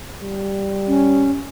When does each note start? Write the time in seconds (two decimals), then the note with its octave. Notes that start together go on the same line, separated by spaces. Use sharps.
0.21 G3
0.88 C#4